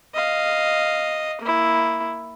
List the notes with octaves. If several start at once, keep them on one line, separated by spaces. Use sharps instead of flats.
D#5 F5
A#3 E4